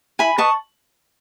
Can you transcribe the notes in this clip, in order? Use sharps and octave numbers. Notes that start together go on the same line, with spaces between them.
E4 G#5 B5
B4 D#5 A5 C#6